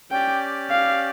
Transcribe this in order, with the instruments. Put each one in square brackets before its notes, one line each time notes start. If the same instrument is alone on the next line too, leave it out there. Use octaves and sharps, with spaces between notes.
[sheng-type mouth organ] C#4 G4 D5 [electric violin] G5
[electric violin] F5